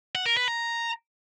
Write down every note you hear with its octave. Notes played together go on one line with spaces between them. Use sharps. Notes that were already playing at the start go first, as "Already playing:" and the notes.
F#5
A#4
B4
A#5